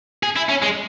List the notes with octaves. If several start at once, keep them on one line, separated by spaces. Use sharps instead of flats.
G#4
E4
C#4
G#3